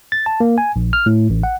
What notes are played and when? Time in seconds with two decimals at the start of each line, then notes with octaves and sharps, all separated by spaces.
0.12 A6
0.26 A5
0.40 A#3
0.58 G#5
0.76 A#1
0.93 F6
1.06 A2
1.30 A1
1.43 F#5